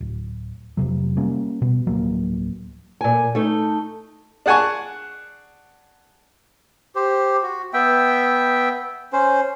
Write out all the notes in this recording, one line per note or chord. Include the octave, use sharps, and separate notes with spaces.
D1
F1 C2 C3 F#3
G3 A#3 C#4
B2
D1 F3 F#3 A#3
A#2 G#5
A3 D#4
D4 G#4 F#5 G#5 A5 C#6
G4 C5
F#4
B3 E5 G5
C#4 C5